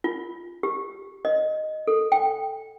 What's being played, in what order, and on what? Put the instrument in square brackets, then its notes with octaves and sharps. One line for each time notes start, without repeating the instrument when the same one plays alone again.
[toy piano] F4
G4
D#5
A4
G5